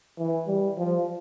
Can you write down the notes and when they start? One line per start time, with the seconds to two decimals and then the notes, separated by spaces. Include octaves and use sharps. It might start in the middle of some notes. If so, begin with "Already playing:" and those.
0.18 E3
0.47 G3
0.77 F3